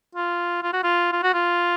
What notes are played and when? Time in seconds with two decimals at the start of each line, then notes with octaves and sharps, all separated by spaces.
0.15 F4
0.63 F4
0.73 F#4
0.83 F4
1.12 F4
1.23 F#4
1.34 F4